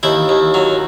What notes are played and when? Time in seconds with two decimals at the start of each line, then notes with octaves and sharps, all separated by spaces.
0.03 D#2 E4
0.29 D#2
0.54 F#3